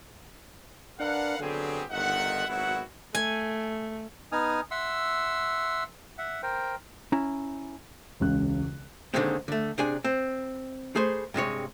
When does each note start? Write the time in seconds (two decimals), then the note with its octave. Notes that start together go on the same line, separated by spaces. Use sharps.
1.00 D4 A#4 B4 F5 F#5
1.40 D3 F#3 B3 C4 G4 G#4
1.91 G1 D#3 D#4 F4 E5 F#5
2.48 G#1 F#3 B3 E4 F#4 F#5
3.15 A3 G#5
4.32 B3 D#4 G#5 D#6 F6
4.71 E5 F#5 C6 E6
6.18 E5 F#5
6.43 A#4 C5 G5
7.12 C#4 E4 A#5
8.20 E1 C#2 C#3 F#6
9.14 D#2 D3 D#3 G#3 C4
9.48 D3 A3
9.78 C3 D4 G#4 G#5
10.04 C4
10.95 A3 G#4 B4 C5
11.34 G2 C3 G#3 C#5